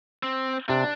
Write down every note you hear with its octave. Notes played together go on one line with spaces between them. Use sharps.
C4
C3 D4